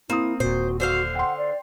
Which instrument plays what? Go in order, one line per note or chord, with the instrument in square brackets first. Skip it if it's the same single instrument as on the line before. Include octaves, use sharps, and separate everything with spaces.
[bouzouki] A#3 [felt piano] C4 D#6 [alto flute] E4
[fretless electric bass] D#1 A#2 [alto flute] F#4 [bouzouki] C5
[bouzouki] D3 C5 F5 [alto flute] F#4
[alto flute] F#5 [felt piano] G5 C6
[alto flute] D5